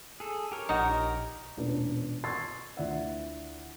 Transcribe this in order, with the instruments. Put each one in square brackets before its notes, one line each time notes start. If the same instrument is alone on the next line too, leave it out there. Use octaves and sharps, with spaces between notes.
[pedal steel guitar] G#4 A4
G4 A#4 C#5
[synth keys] A#1 A#6 [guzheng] D#4 [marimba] D#5 F#5
[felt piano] E1 E2 A#2 C#4 D4 B4
C6 C#6 E6 G#6 A6 C7
D2 E4 F4 D5 E5 F#5